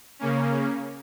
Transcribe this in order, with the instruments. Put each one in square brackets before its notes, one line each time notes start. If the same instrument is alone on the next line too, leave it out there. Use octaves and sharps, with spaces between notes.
[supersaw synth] C#3 A#3 C#4